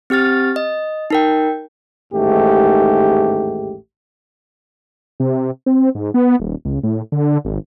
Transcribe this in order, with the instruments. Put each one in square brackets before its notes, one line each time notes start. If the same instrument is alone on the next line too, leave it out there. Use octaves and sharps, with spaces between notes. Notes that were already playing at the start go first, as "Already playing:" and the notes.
[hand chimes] C4 G4 F6 A6
D#5
D#4 A#4 G5
[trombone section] A1 D#2 G#2 A3 G4
[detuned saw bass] C3
C4
G#2
B3
D#1
C#2
A2
D3
G#1